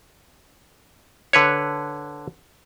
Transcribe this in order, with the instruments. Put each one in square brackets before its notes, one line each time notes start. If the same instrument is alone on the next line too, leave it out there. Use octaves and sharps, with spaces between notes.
[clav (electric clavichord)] D3 B4 C#5